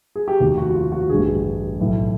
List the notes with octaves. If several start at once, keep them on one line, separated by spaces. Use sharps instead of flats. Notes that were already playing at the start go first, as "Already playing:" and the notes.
G#4
G4
F1 D#2 D#3 F#4
F#4
F#4
F4
F#4
A1 G2 D3 G#4
B1 A2 E3